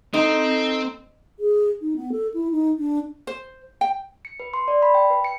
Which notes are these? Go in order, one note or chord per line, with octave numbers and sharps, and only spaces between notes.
C4 D#4 A4
G#4
D#4
B3
A4
E4
D#4
D4
C5
G5
C#7
B4
C6
D5
B5
G5
B4
C#7